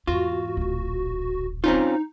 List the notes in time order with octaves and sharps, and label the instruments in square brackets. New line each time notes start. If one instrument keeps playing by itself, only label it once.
[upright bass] E2 G#2 [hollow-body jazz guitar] F4 [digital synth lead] F#4
[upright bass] D1 A#1
[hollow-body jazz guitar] C4 C#4 F4 [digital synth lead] D#4